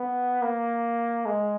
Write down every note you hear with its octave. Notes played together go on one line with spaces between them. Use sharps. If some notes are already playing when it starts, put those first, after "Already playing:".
Already playing: B3
A#3
G#3